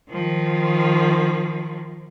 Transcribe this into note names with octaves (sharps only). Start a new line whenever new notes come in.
D#3 F3